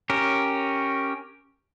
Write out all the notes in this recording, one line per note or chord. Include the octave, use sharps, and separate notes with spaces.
C#4 G4 A#4